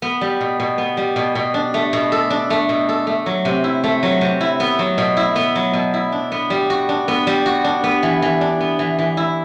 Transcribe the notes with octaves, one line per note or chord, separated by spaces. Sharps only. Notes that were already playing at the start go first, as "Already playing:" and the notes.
B3
G3
B2
B2
B3
G3
B2
B2
D4
A3
B2
A4
D4
A3
B2
A4
A3
F#3
C3
E4
A3
F#3
C3
E4
B3
F#3
B2
E4
B3
F#3
B2
E4
D4
B3
G3
F#4
D4
B3
G3
F#4
D4
B3
E3
E3
D4
B3
E3
E3
E4